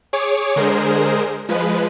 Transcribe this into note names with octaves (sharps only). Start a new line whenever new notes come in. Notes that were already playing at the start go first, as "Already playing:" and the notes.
G#4 C#5 D6
D3 G#3 G#4 A#4 C5
F3 G#3 B4